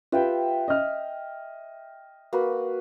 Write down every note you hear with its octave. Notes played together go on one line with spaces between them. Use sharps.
F4 G4 B4 E5 G5
D#5 F6
A#3 F#4 B4